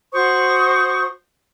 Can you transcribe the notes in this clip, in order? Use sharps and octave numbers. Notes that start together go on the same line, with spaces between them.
F#4 C5 C#6 D#6